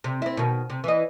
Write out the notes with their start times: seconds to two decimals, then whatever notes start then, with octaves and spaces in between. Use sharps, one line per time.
0.04 C3
0.22 C4 E4
0.37 B2 D#3
0.70 C3
0.84 E3 D#5